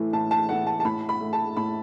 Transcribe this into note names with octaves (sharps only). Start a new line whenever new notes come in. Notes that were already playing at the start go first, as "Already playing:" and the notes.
Already playing: A2 E3 A3
A2 A5
A5
E3 A3 F#5
A5
A5
A2 B5
B5
A3
A5
A2 B5